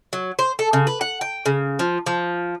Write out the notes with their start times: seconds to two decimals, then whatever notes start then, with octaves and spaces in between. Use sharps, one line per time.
0.13 F#3
0.39 C5
0.59 A4
0.73 C#3
0.87 B4
1.01 F#5
1.21 G5
1.46 C#3
1.79 F3
2.06 F3